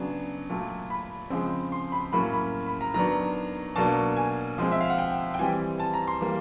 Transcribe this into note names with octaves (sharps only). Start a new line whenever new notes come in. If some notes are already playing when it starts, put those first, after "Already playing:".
Already playing: C#3 F#3 B3 D4
A#2 F#3 A3
B5
C#3 F3 G#3 C4
C6
B5
A2 F#3 A#3 C#4 B5
B5
B5
A#5
D#3 F#3 B3 D4 A#5
B2 F#3 A#3 D4 A5
G#5
F3 G#3 C4
E5
F5
F#5
G5
G5
E3 G3 C4 G#5
A5
A#5
C6
E3 G3 A#3